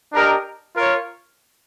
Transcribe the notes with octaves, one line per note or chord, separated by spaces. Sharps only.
D4 G4 A#4 D#5
F4 A#4 C#5